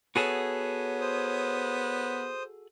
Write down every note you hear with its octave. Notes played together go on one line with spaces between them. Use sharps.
B3 F#4 G#4 A4 C#5
C5 D#6